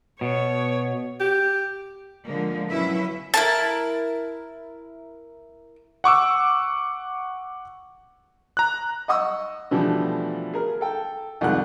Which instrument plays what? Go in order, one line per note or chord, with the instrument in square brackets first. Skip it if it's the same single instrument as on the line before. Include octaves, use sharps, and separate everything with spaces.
[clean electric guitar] B2 [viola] C#5
[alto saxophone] G4
[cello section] D3 F3 G#3 A#3
B2 F#3 C#4 E4 B4 E5
[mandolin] E4 A#4 A5
[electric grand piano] F#5 C#6 D6 E6
A#5 F#6
[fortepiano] D#5 F#5 C#6 D#6 E6
B2 D3 E3 F3 G3 A3
G#4 A#4
A4 G5
C2 F2 D#3 G#3 F#5 F#6